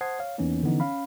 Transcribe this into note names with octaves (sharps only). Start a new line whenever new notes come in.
C5 F#5 A5 D#6 G#6 C7
C#5 F5
E2 E3 A#3 B3 C#4 D#4
D3 E3 F3 B3 C#4 D#4
C#4 F5 B5